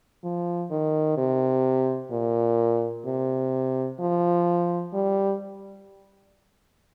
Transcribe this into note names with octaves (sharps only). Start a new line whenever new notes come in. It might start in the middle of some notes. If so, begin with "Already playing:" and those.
F3
D#3
C3
A#2
C3
F3
G3